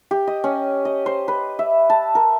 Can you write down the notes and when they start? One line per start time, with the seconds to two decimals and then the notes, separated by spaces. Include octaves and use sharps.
0.11 G4
0.27 D#5
0.44 C#4
0.85 D#5
1.06 C5
1.28 B4
1.59 E5
1.90 A5
2.15 A#4